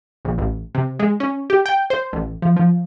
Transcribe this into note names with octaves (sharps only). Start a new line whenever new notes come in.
A#1
A1
C3
G#3
C#4
G4
G5
C5
A1
F3
F3